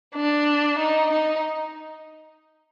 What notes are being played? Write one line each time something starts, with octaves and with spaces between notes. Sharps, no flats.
D4
D#4
D#4